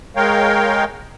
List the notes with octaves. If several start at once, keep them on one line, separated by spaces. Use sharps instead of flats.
G#3 A#4 C#5 F5 G5